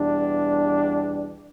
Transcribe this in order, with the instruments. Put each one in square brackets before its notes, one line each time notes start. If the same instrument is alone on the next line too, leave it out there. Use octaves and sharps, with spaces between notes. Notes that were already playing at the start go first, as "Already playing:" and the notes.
Already playing: [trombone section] E2 B2 G3 D4